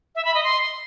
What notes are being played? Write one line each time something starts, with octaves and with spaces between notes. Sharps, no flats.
E5
B5
D#5
C6